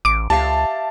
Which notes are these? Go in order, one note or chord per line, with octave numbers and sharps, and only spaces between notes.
A1 D6 D7
C#2 G4 E5 F5 A5